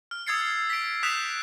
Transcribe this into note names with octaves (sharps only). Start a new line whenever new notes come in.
F6
D#6 E6 G#6 A6 C7 C#7
B6 D7
D#6 F#6 G6 B6 E7 F7